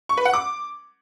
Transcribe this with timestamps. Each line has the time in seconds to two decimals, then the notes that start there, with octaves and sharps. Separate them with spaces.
0.09 C#6
0.17 B4
0.25 F#5
0.33 D6